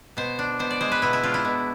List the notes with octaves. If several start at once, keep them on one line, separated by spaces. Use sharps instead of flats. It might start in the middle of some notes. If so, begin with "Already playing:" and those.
B2 C5
D4
B2 C5
D5
G#3 C5
B4
B2 E4
E4
D4 F4
E4
B2